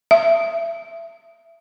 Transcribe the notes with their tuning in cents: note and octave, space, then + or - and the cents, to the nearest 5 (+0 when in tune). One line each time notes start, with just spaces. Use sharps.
E5 +25